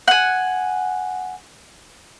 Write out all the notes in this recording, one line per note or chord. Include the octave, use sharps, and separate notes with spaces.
F#5 G#5